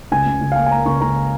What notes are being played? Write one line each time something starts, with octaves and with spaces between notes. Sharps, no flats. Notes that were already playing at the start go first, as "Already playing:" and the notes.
C#2 G#5
C#3
C#2
F5
A#3 G#5
G#5
A#3 A#5
C#2 C#6
C#2 A#5